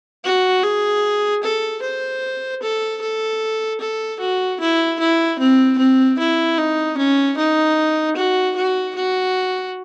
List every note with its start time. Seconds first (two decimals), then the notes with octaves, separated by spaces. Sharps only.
0.24 F#4
0.63 G#4
1.43 A4
1.83 C5
2.62 A4
3.02 A4
3.80 A4
4.20 F#4
4.60 E4
4.99 E4
5.39 C4
5.78 C4
6.19 E4
6.58 D#4
6.98 C#4
7.38 D#4
8.17 F#4
8.56 F#4
8.95 F#4